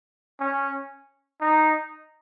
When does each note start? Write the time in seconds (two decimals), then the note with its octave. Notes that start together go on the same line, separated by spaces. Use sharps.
0.40 C#4
1.41 D#4